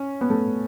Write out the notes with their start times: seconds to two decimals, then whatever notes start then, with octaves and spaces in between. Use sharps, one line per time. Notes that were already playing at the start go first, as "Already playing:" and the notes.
Already playing: C#4
0.21 B3
0.30 A3